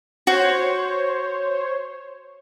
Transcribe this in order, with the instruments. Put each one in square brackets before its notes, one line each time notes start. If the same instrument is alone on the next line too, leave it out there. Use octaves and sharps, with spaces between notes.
[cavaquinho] F#4 [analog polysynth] C5 C#5